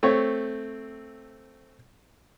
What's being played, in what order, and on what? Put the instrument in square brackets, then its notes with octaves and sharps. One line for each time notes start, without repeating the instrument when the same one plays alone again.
[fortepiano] A3 C4 C#5